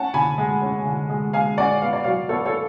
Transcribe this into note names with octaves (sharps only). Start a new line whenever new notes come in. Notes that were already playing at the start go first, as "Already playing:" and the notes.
Already playing: C#4 F#5 A5
D3 G#5 B5
G#3
C#4
D3
G#3
G#3 F5 G#5
C#4 D5 F#5
B3 F5
D5
F#3 C#5 F5
B3 A4 C#5
A4 C#5